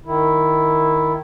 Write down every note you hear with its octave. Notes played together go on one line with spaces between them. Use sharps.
D#3 E4